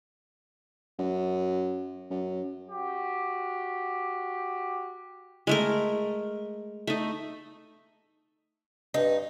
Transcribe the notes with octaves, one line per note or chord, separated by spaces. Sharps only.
F#2
F#2
F#4 G4
G#3 A3 A#4
A3 D#4
G2 D#4